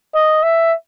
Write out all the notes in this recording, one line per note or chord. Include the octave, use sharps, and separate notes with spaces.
D#5
E5